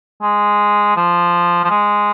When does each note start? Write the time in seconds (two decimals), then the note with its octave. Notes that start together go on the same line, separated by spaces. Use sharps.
0.22 G#3
0.96 F3
1.64 F3
1.70 G#3